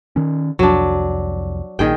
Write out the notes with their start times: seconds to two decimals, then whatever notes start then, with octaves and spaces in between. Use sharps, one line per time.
0.16 D#3 C#4
0.59 C2 F2 F#3 D4
1.79 A#1 A#2 D#3 G#4 G5